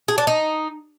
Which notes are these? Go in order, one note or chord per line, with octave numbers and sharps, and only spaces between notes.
G#4
D4
D#4